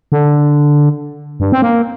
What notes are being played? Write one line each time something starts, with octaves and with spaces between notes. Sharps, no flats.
D3
G2
C4
A#3